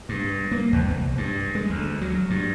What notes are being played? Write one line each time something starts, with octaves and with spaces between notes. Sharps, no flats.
G2
A#3
E2
C2
G2
G#3
D2
F#3
G2